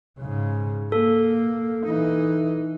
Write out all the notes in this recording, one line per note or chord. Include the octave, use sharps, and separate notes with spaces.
G#2 C#3
A#3 A4
E3 D#4